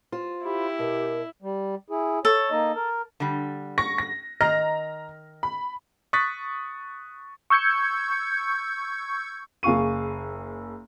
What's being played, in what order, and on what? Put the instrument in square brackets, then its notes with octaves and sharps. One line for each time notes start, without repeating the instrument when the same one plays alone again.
[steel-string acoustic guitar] F4 C5
[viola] E4 [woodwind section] G4 [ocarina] B5
[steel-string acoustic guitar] B2 [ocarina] A#4
[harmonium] G3
E4 G#4
[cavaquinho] A4 [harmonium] C#5
[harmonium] A#3 D#4 D#5
A#4
[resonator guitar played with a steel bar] D3 G3
[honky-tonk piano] C#6 A#6
A#6
[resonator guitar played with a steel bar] D#3 D#5 [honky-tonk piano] A#5 F6 A#6
[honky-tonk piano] B5
[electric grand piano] C#6 D#6 F#6 A6 B6
[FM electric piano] C#6 E6 G6 G#6 C#7
[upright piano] F#1 G#4 F5 C#6 D#7